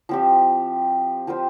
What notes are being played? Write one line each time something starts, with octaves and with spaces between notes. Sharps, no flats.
F3 C4 G4
F3 C4 F4 C5